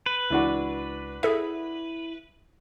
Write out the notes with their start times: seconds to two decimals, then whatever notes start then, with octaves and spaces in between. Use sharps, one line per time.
0.06 B4
0.30 C#2 E3 D4 F#4
1.23 E4 G#4 A4 E5